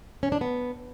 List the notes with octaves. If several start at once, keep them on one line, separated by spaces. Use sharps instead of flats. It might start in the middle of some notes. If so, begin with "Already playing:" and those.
C#4
D4
B3